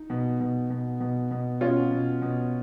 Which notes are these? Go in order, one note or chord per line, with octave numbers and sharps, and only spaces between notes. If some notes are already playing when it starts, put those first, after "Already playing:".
Already playing: D#4
B2
B2
B2
B2
B2
B2 C#4 F4
B2
B2